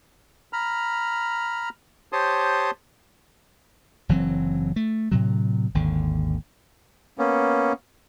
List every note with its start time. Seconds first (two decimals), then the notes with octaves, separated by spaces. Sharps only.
0.53 A#5 B5 F6
2.13 G4 C5 C#5 A5 C6 D#6
4.09 F#1 E3 F#3 C4
4.76 A3
5.12 A2 C3 F#3
5.74 G#1 D#2 D3
7.18 A#3 B3 C#4